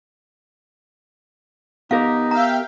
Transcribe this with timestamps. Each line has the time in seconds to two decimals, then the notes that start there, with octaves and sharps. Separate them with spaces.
1.91 B3 D#4 G4 A#4 F5
2.31 E5 F5 G5 A#5